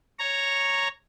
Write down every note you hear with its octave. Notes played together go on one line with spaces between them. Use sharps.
C#5 A#5